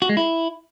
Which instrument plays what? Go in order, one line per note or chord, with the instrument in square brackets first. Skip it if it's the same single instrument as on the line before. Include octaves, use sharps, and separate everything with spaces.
[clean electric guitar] F#4
G#3
E4